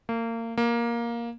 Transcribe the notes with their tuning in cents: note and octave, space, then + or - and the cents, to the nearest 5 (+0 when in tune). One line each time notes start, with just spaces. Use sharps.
A#3 -30
A#3 +10